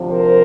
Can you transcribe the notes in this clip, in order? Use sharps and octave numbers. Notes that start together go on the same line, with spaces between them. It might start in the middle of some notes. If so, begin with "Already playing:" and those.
Already playing: D2 C3 F3
A#4 C5